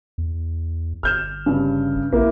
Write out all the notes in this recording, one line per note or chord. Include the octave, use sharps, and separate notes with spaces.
E2
G1 F6 G6 E7
G2 C#3
A#1 A#3 E4